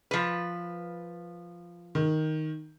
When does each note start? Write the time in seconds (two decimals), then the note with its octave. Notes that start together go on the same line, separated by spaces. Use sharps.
0.11 F3 B4
1.95 D#3